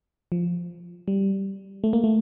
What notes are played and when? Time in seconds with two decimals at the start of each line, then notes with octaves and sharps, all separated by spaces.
0.32 F3
1.08 G3
1.84 A3
1.93 A#3
2.04 A3